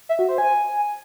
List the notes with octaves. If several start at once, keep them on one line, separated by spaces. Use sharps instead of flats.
E5
F#4
C5
G#5